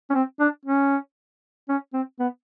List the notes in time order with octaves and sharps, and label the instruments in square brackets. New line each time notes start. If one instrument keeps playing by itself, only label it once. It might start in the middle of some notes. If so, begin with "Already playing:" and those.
[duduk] C#4
C4
D4
C#4
C#4
C4
B3